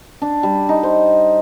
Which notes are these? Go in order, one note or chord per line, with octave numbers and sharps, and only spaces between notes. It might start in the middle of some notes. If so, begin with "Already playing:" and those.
D4
G3
D#4
C5